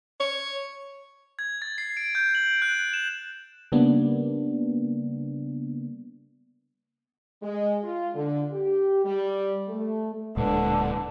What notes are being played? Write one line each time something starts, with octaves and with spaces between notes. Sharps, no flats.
C#5
G#6
A6
C7
D7
G6
F#7
F#6
E7
C#3 G3 A#3 B3 D4
G#3
F4
D3
G4
G3
A3
D1 A#2 D3 G#3 B4